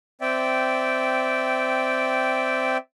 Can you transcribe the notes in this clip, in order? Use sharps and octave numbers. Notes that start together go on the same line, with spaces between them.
C4 D5 E5 G5